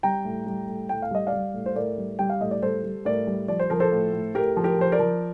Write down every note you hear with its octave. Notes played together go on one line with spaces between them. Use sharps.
G3 G5 A#5
A2
G3
A2
A2 G5
F5
G3 D#5
D5 F5
G3
A2
C5
A2 A#4 D5
G3
G3 G5
F5
A2 D#5
D5
G3 A4 C5
G3
A2 A#4 D5
G3
F3 D5
C5
F3 A#4
A4 C5
A2
A2
A2 G4 A#4
F3
G4 A#4
F3 C5
A#4 D5
F3